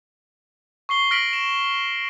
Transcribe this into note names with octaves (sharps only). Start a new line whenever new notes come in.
C#6 C7 G7
F6 A#6 B6 D7 F#7
E7